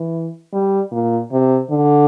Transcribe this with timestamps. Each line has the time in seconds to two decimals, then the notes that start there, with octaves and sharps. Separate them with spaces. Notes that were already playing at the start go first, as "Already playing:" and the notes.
Already playing: E3
0.53 G3
0.92 A#2
1.32 C3
1.71 D3